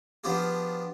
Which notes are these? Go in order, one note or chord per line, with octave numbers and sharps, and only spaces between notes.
F3 B3 D4 F4 G4 G#4